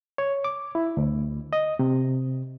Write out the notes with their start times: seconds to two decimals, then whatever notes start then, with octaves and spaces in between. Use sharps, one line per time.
0.18 C#5
0.44 D6
0.75 E4
0.97 D2
1.53 D#5
1.79 C3